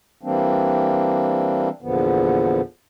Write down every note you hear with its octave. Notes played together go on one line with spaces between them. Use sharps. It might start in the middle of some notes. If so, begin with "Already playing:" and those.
E3 G3 A#3 C4 D4
E2 A#2 D3 F3 B3